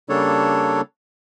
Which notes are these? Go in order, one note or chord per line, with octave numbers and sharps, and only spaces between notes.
C#3 G3 A#3 D4 A4 C#5